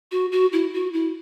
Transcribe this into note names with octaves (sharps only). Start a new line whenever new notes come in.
F#4
F#4
E4
F#4
E4